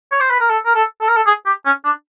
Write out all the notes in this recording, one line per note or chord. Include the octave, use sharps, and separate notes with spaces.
C#5
C5
B4
A#4
A4
A#4
A4
A4
A#4
A4
G#4
G4
C#4
D4